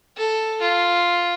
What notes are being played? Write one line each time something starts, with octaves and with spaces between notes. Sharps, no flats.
A4
F4